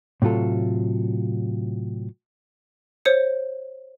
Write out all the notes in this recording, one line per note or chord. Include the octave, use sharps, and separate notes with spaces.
A2 C3 F#3 F4 A4
C5 C#5 C#7